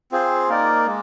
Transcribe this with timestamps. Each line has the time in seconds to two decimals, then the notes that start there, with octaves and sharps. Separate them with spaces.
0.12 C4 F4 G#4 C5
0.49 A#3 D#4 A#4 D5
0.86 G#3